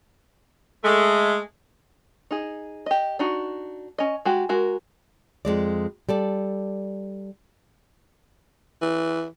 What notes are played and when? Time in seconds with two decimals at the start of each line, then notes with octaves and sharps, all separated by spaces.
0.83 G#3 A3
2.31 D#4 G#4
2.86 G4 D#5
3.19 D4 D#4 F#4
3.98 C#4 D#5
4.25 G#3 F#4 G4
4.49 G#3 F#4 A#4
5.45 F2 G#3 D5
6.09 G3 A4 D5
8.82 E3